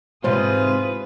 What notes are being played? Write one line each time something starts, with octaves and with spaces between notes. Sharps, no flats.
E2 G#2 C3 F4 G#4 B4 C5